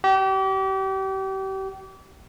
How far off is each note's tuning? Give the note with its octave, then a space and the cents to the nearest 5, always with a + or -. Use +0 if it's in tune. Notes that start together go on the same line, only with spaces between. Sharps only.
G4 -35